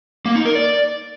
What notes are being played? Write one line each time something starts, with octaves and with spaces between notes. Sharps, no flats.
A#3
D#4
A#4
D5